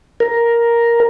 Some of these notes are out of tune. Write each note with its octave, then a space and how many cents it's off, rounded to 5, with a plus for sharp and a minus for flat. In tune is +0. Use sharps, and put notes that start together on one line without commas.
A#4 +5